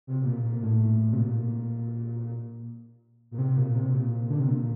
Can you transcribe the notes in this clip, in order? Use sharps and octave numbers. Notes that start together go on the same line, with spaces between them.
C3
C3
A#2
A#2
A2
C3
A#2
A#2
C3
A#2
C3
A#2
D3
C3
A#2